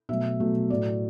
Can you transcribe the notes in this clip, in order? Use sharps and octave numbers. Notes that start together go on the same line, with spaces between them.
B2 F#3 A3 E5
B2 F#3 A3
A2 F#3 A3 D5